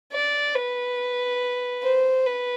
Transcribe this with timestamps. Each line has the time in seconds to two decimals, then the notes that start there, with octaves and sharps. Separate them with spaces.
0.13 D5
0.55 B4
1.84 C5
2.26 B4